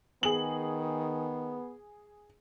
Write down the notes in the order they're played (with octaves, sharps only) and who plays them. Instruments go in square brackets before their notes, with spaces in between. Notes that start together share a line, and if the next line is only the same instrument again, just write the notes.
[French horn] D#3 [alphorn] B3 [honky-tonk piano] G#4 F#7